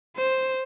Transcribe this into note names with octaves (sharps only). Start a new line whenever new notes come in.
C5